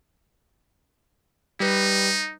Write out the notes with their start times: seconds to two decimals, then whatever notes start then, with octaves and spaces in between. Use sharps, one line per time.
1.60 G3 D#4 B4